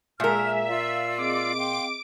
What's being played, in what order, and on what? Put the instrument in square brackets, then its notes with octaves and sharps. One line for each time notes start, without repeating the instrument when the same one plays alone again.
[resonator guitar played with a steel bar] A#2 A#4 [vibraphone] G#3 G#4 G#5 [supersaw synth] E5 [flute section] F6
[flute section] F4 D5 E6 [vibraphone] F5
[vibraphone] C4 G#4 D#5 [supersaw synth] D6 D7
[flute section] F5 G5 C6